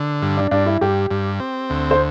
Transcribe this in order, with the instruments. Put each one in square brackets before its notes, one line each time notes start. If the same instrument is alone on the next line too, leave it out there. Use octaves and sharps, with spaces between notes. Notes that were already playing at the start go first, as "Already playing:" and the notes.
Already playing: [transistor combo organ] D3
G2
[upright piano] D4
[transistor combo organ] G2 [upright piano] D4
[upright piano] E4
[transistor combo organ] G2 [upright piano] G4
[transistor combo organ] G2
C4
D2
[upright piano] C5